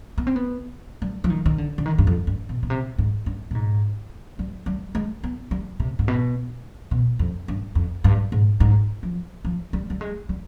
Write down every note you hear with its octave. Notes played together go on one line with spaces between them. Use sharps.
B3
C4
B3
G3
F3
D#3
D#3
D3
D3
D#3
G2
F2
G2
B2
B2
C3
G#2
G2
B2
G#2
G3
G3
G#3
B3
G3
C3
G#2
B2
B2
F2
G2
F2
G2
G#2
G#2
F3
F3
G3
G3
G#3
G3